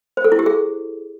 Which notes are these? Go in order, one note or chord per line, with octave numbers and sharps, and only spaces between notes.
C5
A4
E4
G4
G#4